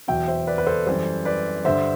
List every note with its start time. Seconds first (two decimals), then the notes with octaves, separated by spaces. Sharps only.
0.08 E2 B2 F#3 E5 G5
0.28 C5 E5
0.47 B4 D5
0.58 B4
0.67 A4 C5
0.87 F#2 E3 G3 A4 C5
1.25 B4 D5
1.65 G2 D3 G3 C5 E5